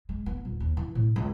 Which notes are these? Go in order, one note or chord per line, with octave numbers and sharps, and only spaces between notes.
G#3
B3
D#1
D#2
E3
A2
C#2